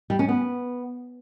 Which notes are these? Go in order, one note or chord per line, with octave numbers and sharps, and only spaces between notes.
G3
C#4
B3